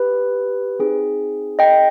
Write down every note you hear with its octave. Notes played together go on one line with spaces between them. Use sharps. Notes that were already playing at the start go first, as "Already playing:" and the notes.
Already playing: G4 B4
C4 D#4 G#4
D#5 G5